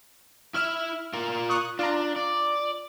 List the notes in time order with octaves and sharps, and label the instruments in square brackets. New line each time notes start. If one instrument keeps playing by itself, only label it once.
[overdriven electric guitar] E4 E5 [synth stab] F6
[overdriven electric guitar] F4 A#4
[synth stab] C#6 D#6 F#6
[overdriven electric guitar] D4 [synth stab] F4 A#5
[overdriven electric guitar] D5